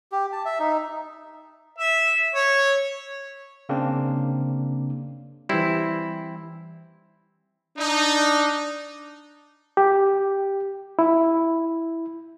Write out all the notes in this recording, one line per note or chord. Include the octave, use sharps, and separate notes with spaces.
G4
A5
E5
D#4
E5
C#5
C#3 A#3 C4 D4
E3 G3 C4 E4
D4 D#4
G4
E4